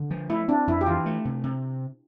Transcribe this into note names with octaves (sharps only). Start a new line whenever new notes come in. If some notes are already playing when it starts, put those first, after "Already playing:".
Already playing: D3
F3
A3 E4
C4 D4
F2 E4
G4
E3 F4
A3
C3
C3